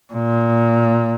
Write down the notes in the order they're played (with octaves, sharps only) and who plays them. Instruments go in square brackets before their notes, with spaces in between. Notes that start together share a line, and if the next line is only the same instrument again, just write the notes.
[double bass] A#2